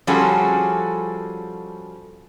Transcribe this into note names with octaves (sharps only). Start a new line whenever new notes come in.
F3 G3 C#4 F#4 G#4 A4